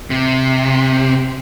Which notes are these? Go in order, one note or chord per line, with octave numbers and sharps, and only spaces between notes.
C3